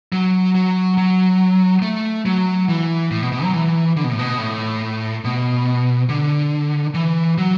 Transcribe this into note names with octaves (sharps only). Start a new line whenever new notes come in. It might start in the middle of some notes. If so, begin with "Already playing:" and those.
F#3
F#3
F#3
A3
F#3
E3
A2
B2
B2
F#3
E3
D3
B2
A2
B2
A2
B2
D3
E3
F#3